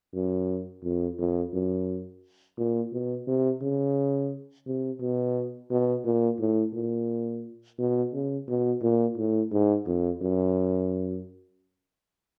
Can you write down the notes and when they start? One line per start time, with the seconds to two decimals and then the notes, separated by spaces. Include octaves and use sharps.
0.14 F#2
0.84 F2
1.19 F2
1.53 F#2
2.58 A#2
2.93 B2
3.27 C3
3.62 C#3
4.66 C3
5.00 B2
5.70 B2
6.05 A#2
6.39 A2
6.74 A#2
7.78 B2
8.13 C#3
8.48 B2
8.82 A#2
9.17 A2
9.52 G#2
9.87 F2
10.22 F#2